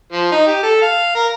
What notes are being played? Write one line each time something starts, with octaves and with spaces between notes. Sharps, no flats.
F3
D#4
G4
A4
F5
A#4